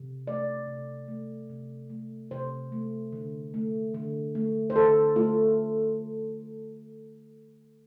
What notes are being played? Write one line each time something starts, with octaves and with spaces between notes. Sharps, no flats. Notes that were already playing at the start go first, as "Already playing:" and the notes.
Already playing: C3
A3 D5
C3
A3
C3
A3
C3 C5
A3
D3
A3
D3
A3
C5
D3 A4
A3 F4